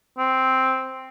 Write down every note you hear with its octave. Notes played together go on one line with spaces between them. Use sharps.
C4